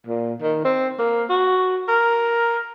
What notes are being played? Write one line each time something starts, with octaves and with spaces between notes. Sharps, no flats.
A#2
D#3
C4
A#3
F#4
A#4